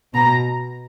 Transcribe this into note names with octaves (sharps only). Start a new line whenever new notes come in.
B2 A#5